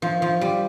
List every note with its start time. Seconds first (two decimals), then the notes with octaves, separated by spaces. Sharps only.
0.02 F3
0.22 F3
0.41 G3